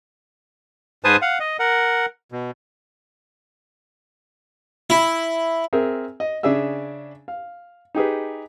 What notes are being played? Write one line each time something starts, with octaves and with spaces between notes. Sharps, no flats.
G#2 B4 C5 G#5 A5 D#6
F5 F#5
D#5
A#4 F#5
B2
E4
C4 G#4 A#4 E5
D#5
C#3 D4 G#4 E5 E6
F5
D#4 G4 G#4 B4